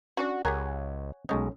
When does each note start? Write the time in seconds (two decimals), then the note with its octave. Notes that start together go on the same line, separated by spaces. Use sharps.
0.17 C#4 D4 F#4 D5
0.45 C#2 G4 G#4 A#4 C#5 F#5 G#5
1.29 B1 G#3 A3 C#4 D#5